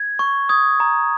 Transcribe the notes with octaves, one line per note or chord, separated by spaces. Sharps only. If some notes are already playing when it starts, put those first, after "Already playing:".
Already playing: G#6
C#6
D#6 G#6
A#5